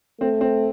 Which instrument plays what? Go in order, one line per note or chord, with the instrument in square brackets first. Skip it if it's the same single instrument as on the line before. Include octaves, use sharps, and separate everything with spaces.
[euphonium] A3 [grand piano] C4
[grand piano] C4